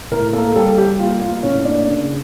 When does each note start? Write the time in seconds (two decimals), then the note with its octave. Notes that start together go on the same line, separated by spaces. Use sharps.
0.11 A2 A#4
0.33 A#3 A4
0.55 G3 A4
0.78 G3 G4
0.99 A#3 F4
1.22 A#3 F4
1.43 A2 C#4
1.65 A#3 D4
1.88 C#3